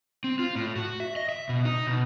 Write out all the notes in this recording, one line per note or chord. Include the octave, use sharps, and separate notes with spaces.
C4
F4
A2
F#4
E5
D#5
E5
B2
D#4
B2